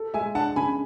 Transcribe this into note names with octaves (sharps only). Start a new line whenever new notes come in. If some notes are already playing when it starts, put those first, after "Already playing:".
Already playing: A4
G#3 E5 G#5
D4 F#5 A5
C#3 G#5 B5